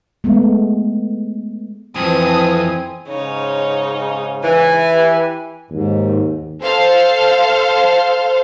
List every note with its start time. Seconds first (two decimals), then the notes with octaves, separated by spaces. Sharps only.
0.24 G#3 A3 B3
1.95 F2 E3 C4 G#5 D#6
3.08 G#2 C#3 D#4 C#5
4.43 E3 G#5
4.90 G4 B4
5.70 D#2 G#2
6.62 A4 C5 F5